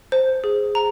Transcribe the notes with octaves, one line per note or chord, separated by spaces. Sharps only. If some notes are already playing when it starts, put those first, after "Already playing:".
C5
G#4
A#5